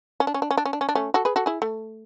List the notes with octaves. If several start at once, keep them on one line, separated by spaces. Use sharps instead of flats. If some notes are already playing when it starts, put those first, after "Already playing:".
C#4
D4
C#4
D4
C#4
D4
C#4
D4
C#4
D4
A3 C#4
F#4 A4
G#4 B4
F#4 A4
E4 G#4
A3